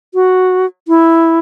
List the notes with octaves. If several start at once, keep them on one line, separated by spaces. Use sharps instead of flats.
F#4
E4